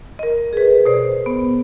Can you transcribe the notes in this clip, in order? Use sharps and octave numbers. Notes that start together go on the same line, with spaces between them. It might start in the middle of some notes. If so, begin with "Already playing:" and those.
A#4 D#5
G#4 B4
B2 C5 D5
B3